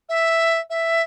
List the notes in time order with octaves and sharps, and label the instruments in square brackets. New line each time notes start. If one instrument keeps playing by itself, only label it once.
[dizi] E5
E5